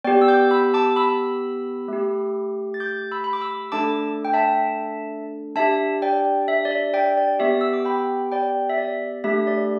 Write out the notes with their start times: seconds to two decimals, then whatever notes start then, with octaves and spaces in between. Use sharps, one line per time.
0.04 B3 G4 D5 G5
0.21 E6
0.28 D6 G6
0.51 B5 E6
0.74 A5 D6
0.96 B5 E6
1.88 A3 G4
2.74 A6
2.80 D6 G6
3.11 B5 E6
3.24 B5
3.33 D6
3.41 B5 E6
3.72 A3 D4 A4 A5 D6
4.25 G5
4.33 E5 A5
5.56 D4 G4 E5 A5
6.02 D5 G5
6.48 E5
6.65 D5
6.71 E5
6.93 D5 G5
7.17 D5
7.39 B3 G4 E5
7.61 E6
7.73 D6
7.85 G5 B5
8.32 D5 G5
8.70 E5
8.78 D5
9.24 A3 D4 G4 E5
9.47 D5